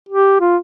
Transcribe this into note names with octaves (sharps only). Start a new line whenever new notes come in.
G4
F4